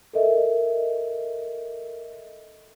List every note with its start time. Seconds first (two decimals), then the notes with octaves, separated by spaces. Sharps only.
0.13 A4 A#4 D#5 E5